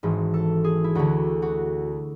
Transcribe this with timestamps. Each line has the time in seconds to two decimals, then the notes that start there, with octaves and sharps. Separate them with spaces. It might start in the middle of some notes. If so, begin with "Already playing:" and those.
0.03 G#1 G#2 E3 F#4
0.34 A4
0.64 G#4
0.84 E4
0.95 D2 D3 F#4
1.42 F#4